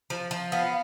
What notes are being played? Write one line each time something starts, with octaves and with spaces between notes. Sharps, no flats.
F3
F3
B3 F5